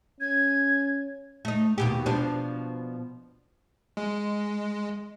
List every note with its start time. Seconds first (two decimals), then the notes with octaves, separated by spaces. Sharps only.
0.21 C#4 G#6
1.45 A3 D#4
1.78 D#2 B2 G4
2.06 B2 F3 D4
3.97 G#3